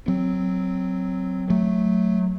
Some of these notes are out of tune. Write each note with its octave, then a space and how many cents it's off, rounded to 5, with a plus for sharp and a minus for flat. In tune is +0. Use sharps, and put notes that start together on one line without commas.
F#3 +5 C4 +0
F#3 +0 A3 +0